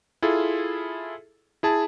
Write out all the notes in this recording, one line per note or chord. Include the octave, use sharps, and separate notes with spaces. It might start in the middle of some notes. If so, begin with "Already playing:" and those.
E4 F4 G#4 A4
E4 G#4 A5